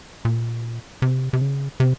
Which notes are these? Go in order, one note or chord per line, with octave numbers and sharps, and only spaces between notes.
A#2
C3
C3
C#3
C3